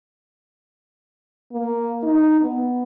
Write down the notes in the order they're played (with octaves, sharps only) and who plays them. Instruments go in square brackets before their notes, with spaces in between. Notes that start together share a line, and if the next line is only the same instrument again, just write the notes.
[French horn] A#3
D#4
B3